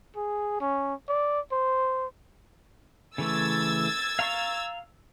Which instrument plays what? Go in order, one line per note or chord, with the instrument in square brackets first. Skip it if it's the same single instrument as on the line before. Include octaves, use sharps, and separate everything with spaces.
[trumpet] G#4
C#4
D5
C5
[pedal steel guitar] C#3 E3 A3 [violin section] E6 G#6 A6
[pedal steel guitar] F5 A#5 C#6